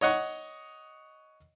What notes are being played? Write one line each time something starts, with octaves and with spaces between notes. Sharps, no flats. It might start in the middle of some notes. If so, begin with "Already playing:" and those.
C#5 D#5 F#5 C#6